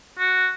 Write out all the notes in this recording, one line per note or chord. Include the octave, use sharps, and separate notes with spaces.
F#4